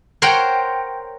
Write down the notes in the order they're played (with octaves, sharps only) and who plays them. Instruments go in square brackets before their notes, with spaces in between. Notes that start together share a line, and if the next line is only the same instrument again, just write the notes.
[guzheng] A#4 C5 C#5 F#5 G5